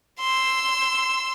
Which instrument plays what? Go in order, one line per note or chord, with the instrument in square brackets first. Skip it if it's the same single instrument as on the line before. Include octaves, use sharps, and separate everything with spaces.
[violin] C6 E6